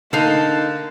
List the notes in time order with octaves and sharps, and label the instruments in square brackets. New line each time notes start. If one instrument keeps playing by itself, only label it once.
[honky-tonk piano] D3 A#3 [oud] D#4 F5 [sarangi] A5